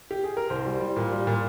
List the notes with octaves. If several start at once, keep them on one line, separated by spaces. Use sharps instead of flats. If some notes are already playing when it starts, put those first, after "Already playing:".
G4
G#4
A#4
C2 C5
G3
G3
A#2
G3
A#2